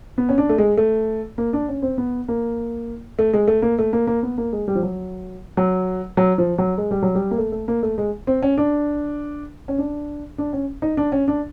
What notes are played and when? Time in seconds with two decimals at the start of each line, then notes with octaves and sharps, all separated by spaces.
0.18 B3
0.29 C#4
0.38 D4
0.49 A3
0.58 G#3
0.77 A3
1.38 A#3
1.53 D4
1.68 C#4
1.82 C4
1.98 B3
2.28 A#3
3.19 A3
3.33 G#3
3.48 A3
3.62 A#3
3.79 A3
3.93 A#3
4.07 A#3
4.23 B3
4.38 A#3
4.53 G#3
4.68 G3
4.75 F3
4.83 F#3
5.57 F#3
6.17 F#3
6.38 F3
6.58 F#3
6.78 G#3
6.91 G3
7.02 F#3
7.15 G3
7.31 A#3
7.38 A3
7.52 A3
7.68 A#3
7.83 A3
7.98 G#3
8.27 C4
8.42 C#4
8.58 D4
9.68 C#4
9.78 D4
10.38 D4
10.53 C#4
10.82 D#4
10.97 D4
11.12 C#4
11.28 D4